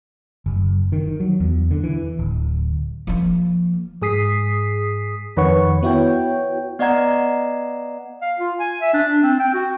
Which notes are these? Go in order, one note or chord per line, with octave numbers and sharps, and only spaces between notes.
F#1
D#3
F#3
E2
D3
E3
D1
F3 A#3
G#2 G#4 D#6 B6 C7
F2 D#3 B4 C#5 F#5 C#6
B3 E4 F#4 C#5 G5
B3 D5 D#5 F#5 A#5 G#6
F5
F4
G#5
E5
D4
C4
G5
F#4